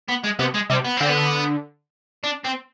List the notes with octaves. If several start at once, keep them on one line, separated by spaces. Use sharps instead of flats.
B3
G#3
C3 B3
G#3
C3 G3
B3
D3 C4
B3
D4
C4